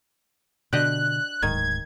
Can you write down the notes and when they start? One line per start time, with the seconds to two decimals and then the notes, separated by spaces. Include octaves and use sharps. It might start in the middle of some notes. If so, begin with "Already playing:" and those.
0.73 B2 D3 D4 G4 D#5 F#6
1.43 D1 G#2 D#3 G#6